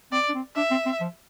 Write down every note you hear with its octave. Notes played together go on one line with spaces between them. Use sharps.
C4 D5
D4
C4
D4 E5
C4
C4
F3